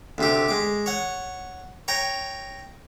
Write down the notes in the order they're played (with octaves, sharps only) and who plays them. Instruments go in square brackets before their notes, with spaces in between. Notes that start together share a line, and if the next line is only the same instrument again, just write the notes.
[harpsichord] D2 C3 G4
G#3 D6
C#5 F#5
C#5 G5 A#5